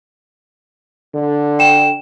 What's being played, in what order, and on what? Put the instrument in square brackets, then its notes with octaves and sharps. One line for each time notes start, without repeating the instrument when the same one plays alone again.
[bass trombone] D3
[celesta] G5 E7